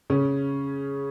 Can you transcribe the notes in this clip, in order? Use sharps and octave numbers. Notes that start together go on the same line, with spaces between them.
C#3 C#4